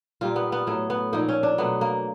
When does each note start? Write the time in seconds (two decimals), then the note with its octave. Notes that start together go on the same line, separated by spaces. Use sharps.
0.21 A#2 G3 A#3 F4
0.36 B3
0.52 B3
0.67 A2 F#3 A3
0.90 B3
1.13 A#2 F3 A#3 D#4
1.29 C#4
1.43 D4
1.58 B2 F#3 A3 B3
1.81 A#3